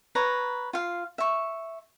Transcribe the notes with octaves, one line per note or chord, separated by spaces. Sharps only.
B4 C#5 A#5
F4 F5
E5 C#6